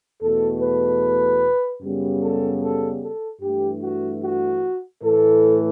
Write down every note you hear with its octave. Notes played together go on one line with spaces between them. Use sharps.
E2 B2 A3 A4
B4
F#2 C#3 G3 B3
A4
A4
A4
G2 E3 A3 G4
F#4
F#4
A2 E3 A3 A4